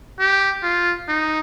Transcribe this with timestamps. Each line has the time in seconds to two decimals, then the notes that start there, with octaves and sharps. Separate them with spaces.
0.20 G4
0.63 F4
1.08 D#4